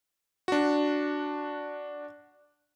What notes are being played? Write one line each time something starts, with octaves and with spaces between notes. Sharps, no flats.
D4 F#4